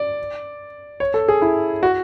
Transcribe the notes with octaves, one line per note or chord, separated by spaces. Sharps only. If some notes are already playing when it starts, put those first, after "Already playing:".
Already playing: D5
C#5
A4
G#4
E4
F#4